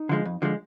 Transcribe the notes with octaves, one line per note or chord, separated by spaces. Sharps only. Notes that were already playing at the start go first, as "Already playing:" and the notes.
Already playing: D#4
D3 F3 G#3
F2
D3 F3 G#3